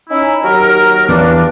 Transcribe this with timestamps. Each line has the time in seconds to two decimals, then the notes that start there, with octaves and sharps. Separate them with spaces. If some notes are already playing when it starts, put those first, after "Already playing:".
0.10 C#4 D#4 E4
0.42 D#2 F#3 A#4
1.09 E2 G2 E3 D4